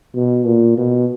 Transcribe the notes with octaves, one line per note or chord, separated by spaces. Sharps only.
B2
A#2
B2